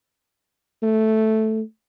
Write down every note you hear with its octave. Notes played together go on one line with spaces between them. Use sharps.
A3